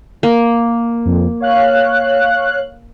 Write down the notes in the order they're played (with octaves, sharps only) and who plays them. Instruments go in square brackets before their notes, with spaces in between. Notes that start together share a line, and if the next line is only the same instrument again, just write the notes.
[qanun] A#3
[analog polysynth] F2
C#5 F5 F#6